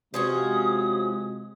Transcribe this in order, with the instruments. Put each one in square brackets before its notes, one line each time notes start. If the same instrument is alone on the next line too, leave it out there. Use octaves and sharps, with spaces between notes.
[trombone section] C3 G#3 [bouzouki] F3 C#4 F#4 [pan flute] D#6